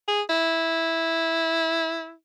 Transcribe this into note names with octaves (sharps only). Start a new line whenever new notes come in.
G#4
E4